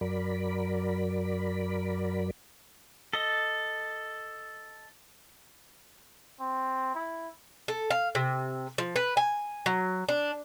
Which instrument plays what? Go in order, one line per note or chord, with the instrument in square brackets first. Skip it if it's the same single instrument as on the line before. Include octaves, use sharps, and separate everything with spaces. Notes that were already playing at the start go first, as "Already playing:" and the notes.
[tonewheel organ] F#2 F#3 A#4 D5 B5
[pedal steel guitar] A4 D#5
[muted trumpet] C4
E4
[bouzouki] A4
F5
C3
F3
B4
G#5
F#3
D4